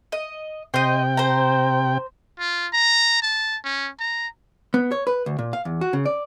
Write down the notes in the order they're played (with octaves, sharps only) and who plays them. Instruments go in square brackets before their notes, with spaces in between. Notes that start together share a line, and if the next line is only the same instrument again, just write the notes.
[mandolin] D#5
[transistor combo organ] C3 G5 [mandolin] C5 D#5
[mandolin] C5 A#5
[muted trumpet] F4
A#5
A5
C#4
A#5
[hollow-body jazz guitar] B3
C#5
B4
D2
A#2
F5
E2
F#4
C#3
D5